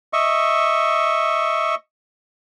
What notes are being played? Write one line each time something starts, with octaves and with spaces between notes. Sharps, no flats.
D#5 E5 C#6